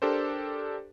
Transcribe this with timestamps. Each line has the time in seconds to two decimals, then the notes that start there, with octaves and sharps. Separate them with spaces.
0.02 D4 G4 A4 A#4 C5